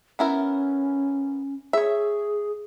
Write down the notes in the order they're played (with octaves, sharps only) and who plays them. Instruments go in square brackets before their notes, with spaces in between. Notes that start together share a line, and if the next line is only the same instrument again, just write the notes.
[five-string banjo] B3 E4 A#4 [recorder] C#4
[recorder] G#4 [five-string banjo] C#5 E5